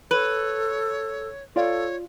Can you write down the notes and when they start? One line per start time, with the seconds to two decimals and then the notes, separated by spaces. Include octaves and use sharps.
0.11 A4 B4 C#5
1.56 F4 A4 C#5 D5 F5